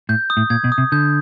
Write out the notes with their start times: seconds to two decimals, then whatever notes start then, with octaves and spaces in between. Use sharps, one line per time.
0.09 A2 G6
0.30 D#6
0.37 A2
0.50 A#2 G#6
0.64 B2
0.72 D#6
0.78 C3
0.92 D3 G6